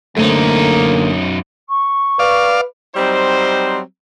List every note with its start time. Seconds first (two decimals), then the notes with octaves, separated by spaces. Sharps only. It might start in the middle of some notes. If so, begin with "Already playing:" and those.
0.17 F#2 D3 A3 A#3 C4 D#4
1.69 C#6
2.19 B4 D5 F5
2.96 F#3 G3 C4 D#4 C5